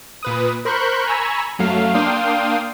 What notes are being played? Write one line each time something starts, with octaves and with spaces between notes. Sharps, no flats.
A#2 B4 D#6
A#4 C5 B5 C#6 F#6 G6
G#5 A#5 B5 C#6 E6
F#2 F#3 A3 F5
A#3 D4 F5 G5 C6 D#6